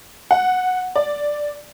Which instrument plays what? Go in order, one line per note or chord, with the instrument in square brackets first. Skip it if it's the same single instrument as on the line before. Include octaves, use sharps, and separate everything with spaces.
[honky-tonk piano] F#5
D5